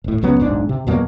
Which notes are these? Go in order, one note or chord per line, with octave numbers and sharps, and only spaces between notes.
D#1 A2
C#2 F#3 B3 C#4
D#1 B1 G#2 D4
C3
E2 B2 F#3 A#3